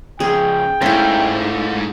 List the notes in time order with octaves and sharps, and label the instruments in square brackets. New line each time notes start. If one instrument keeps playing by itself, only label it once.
[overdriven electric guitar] C#3 F3 [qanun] G#4 [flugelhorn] G5
[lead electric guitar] G#2 [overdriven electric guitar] A3 F4 [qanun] C#4 E4